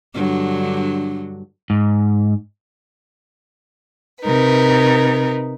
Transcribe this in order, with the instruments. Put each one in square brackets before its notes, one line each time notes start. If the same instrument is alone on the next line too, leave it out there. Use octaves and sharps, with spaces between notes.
[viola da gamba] G2 D3 F#3
[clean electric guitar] G#2
[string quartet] C3 D#4 A#4 B4